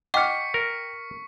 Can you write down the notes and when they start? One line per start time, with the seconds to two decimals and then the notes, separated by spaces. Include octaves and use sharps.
0.14 D#5 F#5 G5 C#6 D6 F6 B6 C#7
0.54 A#4